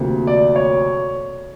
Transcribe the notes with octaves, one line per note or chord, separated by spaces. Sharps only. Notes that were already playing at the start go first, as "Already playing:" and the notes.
Already playing: D2 C3 F3 A#3
D5
C#5